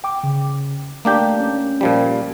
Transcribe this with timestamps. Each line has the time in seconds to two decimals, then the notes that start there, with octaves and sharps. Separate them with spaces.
0.04 G5 D6
0.24 C#3
1.05 A3 A#3 D4 G4 D5 G6
1.40 C#4
1.81 A#2 F3 G3